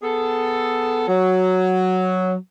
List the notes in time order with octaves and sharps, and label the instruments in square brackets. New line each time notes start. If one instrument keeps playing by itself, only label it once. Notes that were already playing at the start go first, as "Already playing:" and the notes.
[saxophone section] B3 G#4 A4
F#3